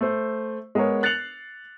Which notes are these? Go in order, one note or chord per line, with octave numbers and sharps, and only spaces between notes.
A3 C5
G#3 B3 G#4 A#4 C#5
F#6 A6 C7 C#7 F7 F#7